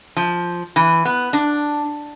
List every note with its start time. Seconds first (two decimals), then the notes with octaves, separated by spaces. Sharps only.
0.16 F3
0.76 E3
1.05 B3
1.33 D4